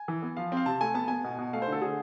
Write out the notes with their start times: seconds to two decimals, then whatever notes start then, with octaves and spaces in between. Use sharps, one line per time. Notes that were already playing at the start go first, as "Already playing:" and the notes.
Already playing: G#5
0.08 E3
0.22 B3
0.37 F3 F5
0.52 C4
0.57 F5
0.66 C3 A5
0.81 A3 G#5
0.94 B3 A5
1.08 B3 G#5
1.24 B2
1.38 B2
1.53 A3 F5
1.62 C5
1.68 D3
1.72 A4
1.81 D3 G#4